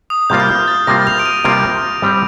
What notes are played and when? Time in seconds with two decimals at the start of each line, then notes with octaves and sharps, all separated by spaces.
0.10 D#6
0.30 C3 G3 A#3 F4 C5 G6
0.40 F6
0.49 G6
0.68 A6
0.87 C3 G3 A#3 F4 C5 A#6
1.07 F7
1.19 D7
1.26 D#7
1.44 C3 G3 A#3 F4 C5 D7
2.02 G3 C4 G4 C5